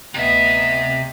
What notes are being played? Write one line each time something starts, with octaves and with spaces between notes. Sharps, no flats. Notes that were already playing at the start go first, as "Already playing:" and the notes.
D2 C3 B3 D#5 E5